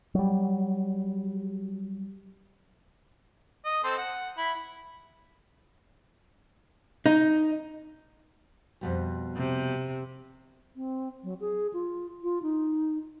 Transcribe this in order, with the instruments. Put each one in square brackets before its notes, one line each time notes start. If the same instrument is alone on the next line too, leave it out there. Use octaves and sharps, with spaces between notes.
[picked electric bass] F#3 G3
[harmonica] D#5
C4 A4 C5
F#5
E4 B5
[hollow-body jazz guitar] D#4
[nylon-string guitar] F2 B2 G3
[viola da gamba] C3
[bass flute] C4
F#3
G#4
F4
F4
D#4